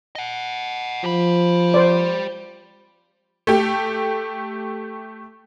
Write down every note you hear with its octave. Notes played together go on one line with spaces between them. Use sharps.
D#5 F#5
F3 G4 B5
C5 D5
A3 G4